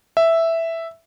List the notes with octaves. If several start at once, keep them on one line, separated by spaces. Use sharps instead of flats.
E5